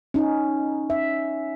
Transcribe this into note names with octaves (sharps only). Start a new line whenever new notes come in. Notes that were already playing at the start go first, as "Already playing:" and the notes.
C#4 D#4
E5